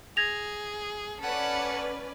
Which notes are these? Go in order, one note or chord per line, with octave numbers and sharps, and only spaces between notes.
G#4 G#6 A#6 F7
C#4 A4 B4 D5 F#5